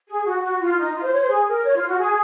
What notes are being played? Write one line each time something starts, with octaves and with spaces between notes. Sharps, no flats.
G#4
F#4
F#4
F4
D#4
F4
C5
C#5
C5
G#4
A#4
C#5
F4
F#4
G#4